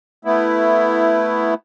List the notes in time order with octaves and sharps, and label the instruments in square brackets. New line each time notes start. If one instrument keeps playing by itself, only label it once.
[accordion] A3 B3 E4